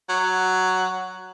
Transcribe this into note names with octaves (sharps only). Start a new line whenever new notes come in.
F#3